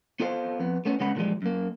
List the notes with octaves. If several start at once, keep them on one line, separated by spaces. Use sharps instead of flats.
B3 F4 A4 C5 F5
F2 B3
A3 B3 C#4
C#3 G#3 B3 C#4 F#5 B5
A#2 D3 E3 F3 G3 G#3
F#2 A#3